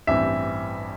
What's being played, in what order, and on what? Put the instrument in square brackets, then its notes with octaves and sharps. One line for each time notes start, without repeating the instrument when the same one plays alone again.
[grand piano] A1 G2 E3 C4 E5